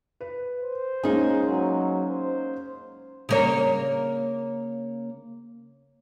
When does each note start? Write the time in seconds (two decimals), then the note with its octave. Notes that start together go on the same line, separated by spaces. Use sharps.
0.21 B4
0.63 C5
1.03 G#3 A#3 C#4 D#4 G#4
1.48 F#3
2.11 C5
3.29 C#3 A#3 C#5